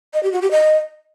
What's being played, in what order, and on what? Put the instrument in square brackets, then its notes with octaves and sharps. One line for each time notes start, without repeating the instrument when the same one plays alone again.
[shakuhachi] D#5
G4
F#4
G4
D#5